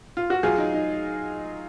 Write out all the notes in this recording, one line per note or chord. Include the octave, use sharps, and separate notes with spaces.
F4
F#4
F#3 F4 G#4
D#4
D#4